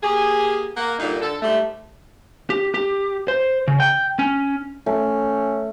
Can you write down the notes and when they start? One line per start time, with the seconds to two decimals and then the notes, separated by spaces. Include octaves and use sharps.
0.03 A#3 G4 G#4
0.77 A#3 F#5
0.99 G2 A#2 D3 D#4
1.22 D3 A4
1.42 G#2 G3 A3
2.50 G4
2.74 G4
3.28 C5
3.68 C#3
3.80 G5
4.19 C#4
4.86 A3 C#4